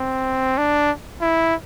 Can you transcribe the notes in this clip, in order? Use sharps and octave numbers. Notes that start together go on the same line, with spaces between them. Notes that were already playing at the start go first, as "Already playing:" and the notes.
Already playing: C4
D4
E4